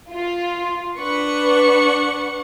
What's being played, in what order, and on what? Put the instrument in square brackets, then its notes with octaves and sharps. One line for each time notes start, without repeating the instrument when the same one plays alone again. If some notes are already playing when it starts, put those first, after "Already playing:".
[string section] F4
[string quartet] D4 F#5 C#6 [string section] B4